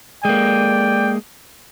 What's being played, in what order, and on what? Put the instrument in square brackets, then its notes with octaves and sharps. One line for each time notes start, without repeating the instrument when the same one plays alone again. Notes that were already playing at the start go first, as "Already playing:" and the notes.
[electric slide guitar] G#3 A#3 [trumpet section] D5 G5